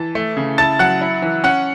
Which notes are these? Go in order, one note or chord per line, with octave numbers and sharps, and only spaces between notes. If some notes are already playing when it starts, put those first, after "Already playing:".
Already playing: E3 A5 A6
A3
C#3
E4 A5 A6
F#3 F#5 F#6
E4
E3
C#4 F#5 F#6